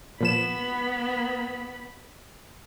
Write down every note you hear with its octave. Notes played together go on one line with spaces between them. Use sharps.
A#2 F3 B3 B5 E7